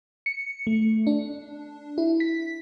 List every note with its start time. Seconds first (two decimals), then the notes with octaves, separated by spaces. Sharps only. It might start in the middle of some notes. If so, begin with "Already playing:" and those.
0.26 C#7
0.67 A3
1.07 D4
1.98 E4
2.20 B6